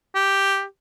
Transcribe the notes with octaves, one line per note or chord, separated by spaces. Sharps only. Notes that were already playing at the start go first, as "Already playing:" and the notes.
G4